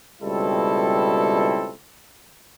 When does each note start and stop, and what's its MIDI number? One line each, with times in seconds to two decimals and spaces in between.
0.22 1.74 37
0.22 1.74 47
0.22 1.74 55
0.22 1.74 60
0.22 1.74 64
0.22 1.74 69